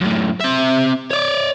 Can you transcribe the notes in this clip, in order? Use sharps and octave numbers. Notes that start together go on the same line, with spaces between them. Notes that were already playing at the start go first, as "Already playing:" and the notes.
F#2 A2
C4 E5
C#5 D5